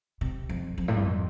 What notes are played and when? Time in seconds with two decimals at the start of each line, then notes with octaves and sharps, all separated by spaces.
0.21 C3
0.49 F2
0.78 F2
0.88 A2
0.97 G2
1.05 F2